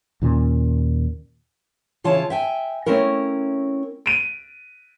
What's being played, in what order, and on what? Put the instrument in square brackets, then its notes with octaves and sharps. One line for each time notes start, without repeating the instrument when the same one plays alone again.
[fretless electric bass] D#2 A#2 C4 C#4
[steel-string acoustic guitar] C#3 E3 F4 C#5 A5
E5 G5 G#5
A3 C4 C#4 E4 A#4
[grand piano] D7 D#7